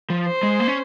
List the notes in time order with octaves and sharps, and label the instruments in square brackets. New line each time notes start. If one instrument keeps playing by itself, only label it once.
[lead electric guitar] F3
[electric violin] C5
[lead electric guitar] G#3
A#3
C#4